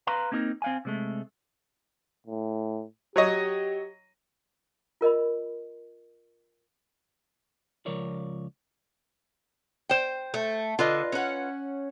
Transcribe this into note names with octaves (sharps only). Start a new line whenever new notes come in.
B4 F5 A#5 C6
A#3 C4 D#4 G4 A#4
C4 F5 G#5
C3 G#3 A3
A2
F#3 G4 C#5 D#5
F4 A#4 D#5 B5
C#2 F3 A#4 C#5 D5
C5 G5
A3
D3 F4 B4 D#5
C#4 F#5